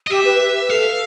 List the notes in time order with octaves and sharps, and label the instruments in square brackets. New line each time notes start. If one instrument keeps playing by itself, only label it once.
[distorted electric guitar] D#5
[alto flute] G4 [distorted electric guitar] E5
[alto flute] B4
B4
[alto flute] A4 [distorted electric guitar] F5